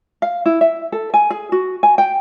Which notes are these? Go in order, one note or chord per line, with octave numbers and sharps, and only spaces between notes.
F5
E4
E5
A4
G#5
G#4
F#4
G#5
G5